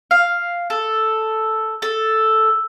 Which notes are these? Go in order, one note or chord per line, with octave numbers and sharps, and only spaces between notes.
F5
A4
A4